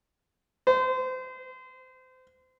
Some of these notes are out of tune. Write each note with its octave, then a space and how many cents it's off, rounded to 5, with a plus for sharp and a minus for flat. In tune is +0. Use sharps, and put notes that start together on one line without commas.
C5 -30